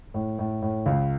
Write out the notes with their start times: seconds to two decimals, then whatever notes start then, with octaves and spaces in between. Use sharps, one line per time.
0.14 A2
0.39 A2
0.62 A2
0.86 C#2